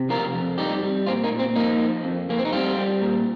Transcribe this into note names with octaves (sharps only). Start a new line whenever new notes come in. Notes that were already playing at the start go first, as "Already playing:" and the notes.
Already playing: C3
F3 F4 A#4
F2
G3 D#4 G4
G3
A#2 C4 F4
A#3 D#4
A#2
C4
F3 A#3 D#4
F3
F2
F2 A#3
C4
D#4
G3 C4 F4
G3
A#2